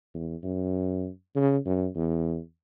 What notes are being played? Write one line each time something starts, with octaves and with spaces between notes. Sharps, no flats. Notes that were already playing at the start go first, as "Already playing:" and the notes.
E2
F#2
C#3
F#2
E2